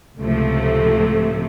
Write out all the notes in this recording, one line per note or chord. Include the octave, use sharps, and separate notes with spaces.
C#2 A2 C3 F3 A3